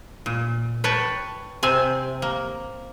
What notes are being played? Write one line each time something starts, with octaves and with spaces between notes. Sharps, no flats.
A#2
B4 C#5 G5 A5
C3 C4 G#5
A#3